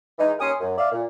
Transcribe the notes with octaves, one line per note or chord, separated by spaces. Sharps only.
E3 G#3 D#4
D#2 C#4 A#4 G#5 C6 D#6
F#2
D5 E5 F5
A#2